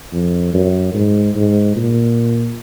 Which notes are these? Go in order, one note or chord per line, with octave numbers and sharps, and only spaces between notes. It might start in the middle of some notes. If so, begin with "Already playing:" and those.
F2
F#2
G#2
G#2
A#2